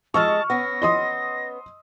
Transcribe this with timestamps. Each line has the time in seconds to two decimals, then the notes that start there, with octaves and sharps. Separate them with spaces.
0.14 G#3 D#5 A5 C#6 E6 F6
0.50 B3 C#4 A#6
0.82 D#5 C6 D#6